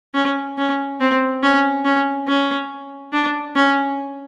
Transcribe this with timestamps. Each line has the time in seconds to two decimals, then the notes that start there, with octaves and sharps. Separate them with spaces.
0.14 C#4
0.58 C#4
1.01 C4
1.43 C#4
1.85 C#4
2.28 C#4
3.13 D4
3.56 C#4